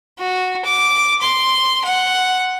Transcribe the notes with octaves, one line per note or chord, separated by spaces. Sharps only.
F#4
D6
C6
F#5